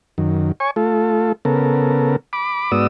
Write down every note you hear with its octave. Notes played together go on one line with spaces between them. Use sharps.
F#2 D#3
C#5 G#5 C#6
A3 F4 A4
C#3 B3 A4 A#4
B5 D6
G#2 B3 F#4 D5 D#6 E6